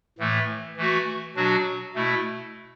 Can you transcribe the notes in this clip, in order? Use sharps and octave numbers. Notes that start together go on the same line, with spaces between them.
A2 E3 A3
E3 A3 F#4
B2 F#3 D4 F#4
B2 A3 E4